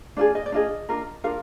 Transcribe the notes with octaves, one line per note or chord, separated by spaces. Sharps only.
D4 F4 G#4 D5
D#5
D5
D4 F4 G#4 D#5
D4 F4 A#4
D4 F4 A#4 F5